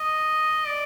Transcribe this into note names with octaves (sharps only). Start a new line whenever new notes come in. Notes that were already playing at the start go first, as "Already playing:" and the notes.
Already playing: D#5
D5